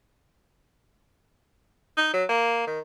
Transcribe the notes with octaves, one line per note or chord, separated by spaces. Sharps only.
D#4
F#3
A#3
D#3